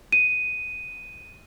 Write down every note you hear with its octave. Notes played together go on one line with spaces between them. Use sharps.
D#7